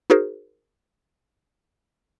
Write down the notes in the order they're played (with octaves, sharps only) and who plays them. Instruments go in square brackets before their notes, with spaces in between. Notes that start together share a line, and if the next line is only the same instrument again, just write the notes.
[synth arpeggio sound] D#4 F#4 G#4 A#4 C5